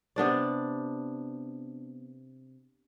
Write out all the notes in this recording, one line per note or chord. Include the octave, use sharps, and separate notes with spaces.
C3 B3 D4 D5